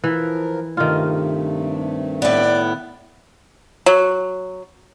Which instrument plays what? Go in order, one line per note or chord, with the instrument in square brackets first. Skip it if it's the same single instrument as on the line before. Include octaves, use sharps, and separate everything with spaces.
[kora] E3 [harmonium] F3 A#4
[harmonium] G2 C3 A3 [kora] D#3 F4
[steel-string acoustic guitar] A2 B3 [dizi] D5
[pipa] F#3